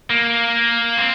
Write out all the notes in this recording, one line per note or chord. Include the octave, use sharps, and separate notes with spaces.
A#3
C4